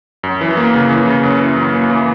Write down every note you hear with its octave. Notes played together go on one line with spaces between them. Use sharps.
F#2
E3
A#3
C#3
E3
C#3
F#2
E3
F#2
A#3
E3